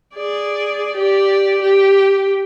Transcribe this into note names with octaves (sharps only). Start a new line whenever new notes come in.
G#4 D5
G4 D5
G4